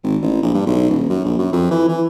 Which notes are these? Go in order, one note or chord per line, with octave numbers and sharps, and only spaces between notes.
G#1
A1
A#1
G2
B1
D#1
F#2
A#1
F#2
F2
E3
E3